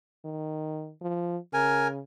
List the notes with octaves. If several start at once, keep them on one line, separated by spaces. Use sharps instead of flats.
D#3
F3
C#3 A#4 G#5